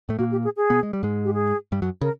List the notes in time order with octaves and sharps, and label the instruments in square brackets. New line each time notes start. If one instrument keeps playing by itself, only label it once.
[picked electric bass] A2 A3
[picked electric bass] A#2 A#3 [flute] F#4
[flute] G4
G#4
G#4
[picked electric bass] B2 B3
G#3
G3
G#2 G#3
[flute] G4
G#4
[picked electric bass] G2 G3
F#2 F#3
[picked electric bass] C#3 [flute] A#4